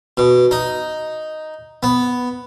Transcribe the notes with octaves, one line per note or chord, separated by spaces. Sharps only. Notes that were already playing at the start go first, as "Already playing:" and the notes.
B2
D#4
B3